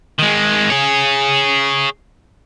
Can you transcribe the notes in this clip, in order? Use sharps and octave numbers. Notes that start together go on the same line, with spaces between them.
D#3 G#3
G#4 C#5